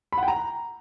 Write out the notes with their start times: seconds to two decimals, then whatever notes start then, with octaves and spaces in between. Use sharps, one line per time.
0.12 B5
0.18 F#5
0.23 G5
0.28 A#5